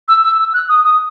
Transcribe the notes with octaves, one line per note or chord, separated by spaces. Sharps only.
E6
E6
E6
F#6
D#6
D#6